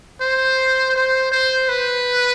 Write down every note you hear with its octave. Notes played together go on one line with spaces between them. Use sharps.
C5
C5
C5
B4